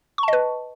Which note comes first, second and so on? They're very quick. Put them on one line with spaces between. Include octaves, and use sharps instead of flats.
C#6 A5 D#5 B4